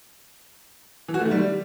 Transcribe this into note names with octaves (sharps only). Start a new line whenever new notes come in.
E3
F#4
A3
D#3
G3